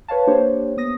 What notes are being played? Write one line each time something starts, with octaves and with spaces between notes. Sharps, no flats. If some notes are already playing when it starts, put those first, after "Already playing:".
B4 C#5 F5 A5
A#3 D4 G4 C5 C#5
B3 D#6 A#6